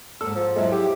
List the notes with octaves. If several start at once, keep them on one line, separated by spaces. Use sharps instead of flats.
G#2 A#3 A4 E6
F3
F#3 G#3 D#4 E4 E5
G4